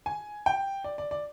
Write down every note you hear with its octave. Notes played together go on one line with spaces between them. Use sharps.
G#5
G5
D5
D5
D5